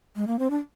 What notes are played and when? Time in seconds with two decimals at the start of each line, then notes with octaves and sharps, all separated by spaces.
0.16 G#3
0.27 A#3
0.39 C4
0.50 D4